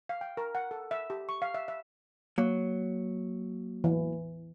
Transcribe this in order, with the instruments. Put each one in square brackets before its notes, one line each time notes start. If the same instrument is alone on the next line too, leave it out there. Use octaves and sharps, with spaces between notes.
[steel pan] F5
G5
A#4
F#5
A4
E5
G4
C#6
F5
E5
E5
[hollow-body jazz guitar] F#3 [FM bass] A#3
[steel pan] E3